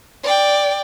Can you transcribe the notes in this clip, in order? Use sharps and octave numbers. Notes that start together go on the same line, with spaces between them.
D5 G5